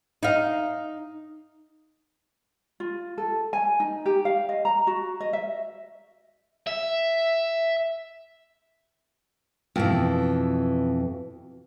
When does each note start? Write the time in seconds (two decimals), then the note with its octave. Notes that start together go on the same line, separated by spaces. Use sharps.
0.23 D#4 F5
2.80 F4
3.18 A4
3.53 G#5
3.80 D#4
4.06 G4
4.25 F5
4.49 D#5
4.65 A#5
4.87 F#4
5.20 D#5
5.33 E5
6.67 E5
9.76 F2 B2 E3